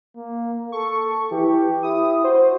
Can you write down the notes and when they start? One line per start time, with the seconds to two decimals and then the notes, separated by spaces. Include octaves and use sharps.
0.16 A#3
0.72 A4 C#6
1.31 E3 G4
1.83 E4 D#6
2.24 F#4 C5